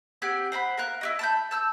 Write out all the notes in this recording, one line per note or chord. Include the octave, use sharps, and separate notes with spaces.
C4 G4 F#5 G#5
C5 F#5 A#5 B5
A#4 F5 F#6
E4 G4 D#5
A5 B5 G6
A5 E6 G6